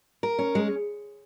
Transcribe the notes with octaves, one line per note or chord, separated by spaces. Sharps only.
A#4
C#4
G#3